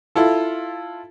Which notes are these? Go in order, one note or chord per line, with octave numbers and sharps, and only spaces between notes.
E4 F4 A4